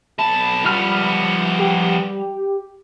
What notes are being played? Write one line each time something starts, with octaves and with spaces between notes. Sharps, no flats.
B1 A5 B5
F3 G3 B3 F6
G4